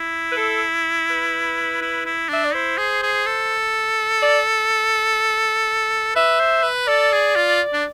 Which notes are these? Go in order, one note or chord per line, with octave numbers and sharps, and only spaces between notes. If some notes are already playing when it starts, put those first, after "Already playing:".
Already playing: E4
B4
A4
B4
E4
E4
D4 E5
D5
E4 C5
G#4
G#4
A4
D5
B4 E5
C5
B4
A4 D5
G#4
F4
D4